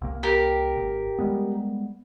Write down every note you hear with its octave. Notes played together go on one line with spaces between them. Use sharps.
C2 A#3
G4 A#4
G#1
G3 G#3 B3